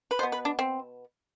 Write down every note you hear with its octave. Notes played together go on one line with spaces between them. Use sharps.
B4
B2 B3 C5
B4
D4
C4